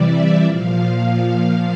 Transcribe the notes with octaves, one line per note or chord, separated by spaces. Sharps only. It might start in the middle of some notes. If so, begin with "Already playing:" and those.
Already playing: C3 E3 G3 D5 E5
A#2 F3 F5